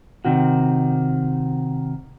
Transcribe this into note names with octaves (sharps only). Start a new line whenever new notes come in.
C3 D#3 F#4